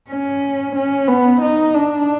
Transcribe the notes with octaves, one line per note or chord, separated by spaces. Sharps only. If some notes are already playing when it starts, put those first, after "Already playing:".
C#4
C#4
B3
D#4
D4